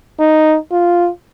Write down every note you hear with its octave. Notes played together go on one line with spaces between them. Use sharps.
D#4
F4